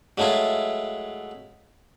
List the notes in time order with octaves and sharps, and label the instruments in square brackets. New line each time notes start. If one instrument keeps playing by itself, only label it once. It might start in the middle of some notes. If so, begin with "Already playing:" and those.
[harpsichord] F#3 G#3 A3 E4 F4